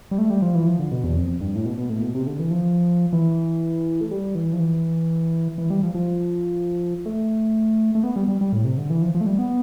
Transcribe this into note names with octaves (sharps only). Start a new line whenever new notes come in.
G3
A3
G3
F3
E3
F3
D3
B2
E2
F2
G2
A2
B2
B2
A2
B2
C3
D3
E3
F3
E3
A3
G3
E3
F3
E3
E3
G3
F3
F3
A3
A3
B3
G3
G3
G3
A2
C3
D3
E3
F3
F3
A3
G3
B3